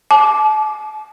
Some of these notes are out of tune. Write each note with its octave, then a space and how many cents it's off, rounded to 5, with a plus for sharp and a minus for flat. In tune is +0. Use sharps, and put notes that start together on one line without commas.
A5 -35 D6 +0